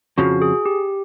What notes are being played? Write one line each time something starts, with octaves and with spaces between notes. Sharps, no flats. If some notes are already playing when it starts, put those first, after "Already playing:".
F2 C#3 F3 F#4
G#4
G4